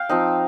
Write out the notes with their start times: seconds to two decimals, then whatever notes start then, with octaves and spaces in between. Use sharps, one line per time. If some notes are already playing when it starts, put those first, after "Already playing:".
Already playing: F5 G5
0.09 F3 C4 D#4